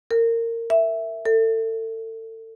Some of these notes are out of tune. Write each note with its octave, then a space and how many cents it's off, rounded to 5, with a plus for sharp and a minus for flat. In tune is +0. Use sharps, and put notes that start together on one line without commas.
A#4 -20
E5 +0
A4 +30